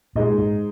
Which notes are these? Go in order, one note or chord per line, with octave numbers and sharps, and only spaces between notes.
A#2 G#3 D#4 G#4 D#5
G#2